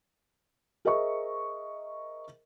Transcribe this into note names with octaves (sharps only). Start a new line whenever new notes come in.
G#4 A#4 C5 D#5 E5 C#6